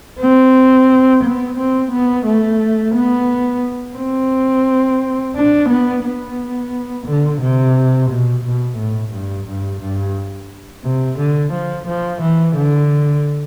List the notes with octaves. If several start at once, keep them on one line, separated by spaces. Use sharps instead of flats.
C4
B3
C4
B3
A3
B3
C4
D4
B3
B3
D3
C3
B2
B2
A2
G2
G2
G2
C3
D3
F3
F3
E3
D3